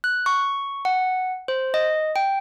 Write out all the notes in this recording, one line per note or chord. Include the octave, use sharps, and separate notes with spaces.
F#6
C#6
F#5
C5
D#5
G5